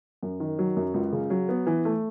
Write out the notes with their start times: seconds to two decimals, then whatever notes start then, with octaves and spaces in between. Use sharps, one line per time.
0.23 F#2
0.40 D#3
0.59 F#3
0.77 F#2
0.94 C#2
1.12 C#3
1.30 F#3
1.49 B3
1.67 E3
1.85 A3